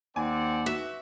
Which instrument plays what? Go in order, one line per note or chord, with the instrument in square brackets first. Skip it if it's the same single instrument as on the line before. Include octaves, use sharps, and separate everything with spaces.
[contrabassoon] D#2 [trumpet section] C4 D5 F#5 [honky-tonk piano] G#5
[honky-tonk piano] F#4 [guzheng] E5